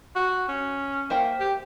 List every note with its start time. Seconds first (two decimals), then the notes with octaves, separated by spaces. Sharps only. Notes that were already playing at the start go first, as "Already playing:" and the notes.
0.16 F#4
0.49 C#4
1.10 A#3 C5 E5 G5
1.40 G4